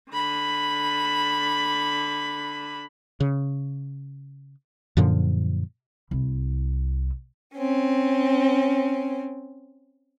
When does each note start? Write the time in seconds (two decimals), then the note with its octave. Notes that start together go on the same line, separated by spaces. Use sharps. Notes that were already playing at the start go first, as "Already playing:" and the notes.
0.12 D3 B5
3.20 C#3
4.97 F#2 A#2 D3 F3
6.11 C2 E4
7.55 C4 C#4